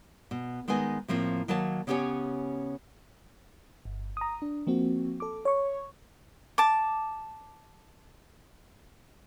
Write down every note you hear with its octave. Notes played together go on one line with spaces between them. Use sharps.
B2
D#3 G#3 B3 D#4 G#5
A2 F3 A#3 C4
D#3 F#3 A#3 C#5 A5
C#3 B3 C#4 G4 C#5 G#5
G1
A#5 D#6
D4
F3 A#3 C4 F#4
A4 D6
C#5 C#6
A5 D6